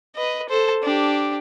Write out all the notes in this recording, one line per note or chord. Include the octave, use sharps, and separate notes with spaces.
B4 D#5
A4 C5
D4 G4